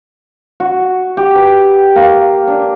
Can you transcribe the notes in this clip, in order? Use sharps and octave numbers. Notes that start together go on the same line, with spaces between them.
F#4
G4
B4
A#3
D4